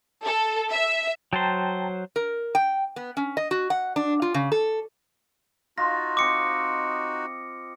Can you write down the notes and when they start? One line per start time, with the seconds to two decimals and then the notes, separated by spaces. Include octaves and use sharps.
0.25 A4
0.72 E5
1.33 F#3 C5 G5 A5 A#5
2.16 A#4
2.55 G5
2.96 B3
3.17 C#4
3.37 D#5
3.51 F#4
3.70 F#5
3.96 D4
4.22 F4
4.34 C#3
4.52 A4
5.78 D#4 F4 F#4 A#6
6.17 C4 D#5 D6 C#7